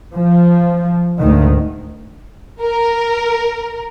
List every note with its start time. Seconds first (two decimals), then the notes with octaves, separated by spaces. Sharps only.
0.15 F3
1.19 D2 G#2 D#3
2.61 A#4